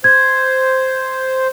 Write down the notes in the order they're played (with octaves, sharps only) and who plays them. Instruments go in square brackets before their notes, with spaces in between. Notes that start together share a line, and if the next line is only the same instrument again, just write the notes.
[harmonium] C5 [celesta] G#6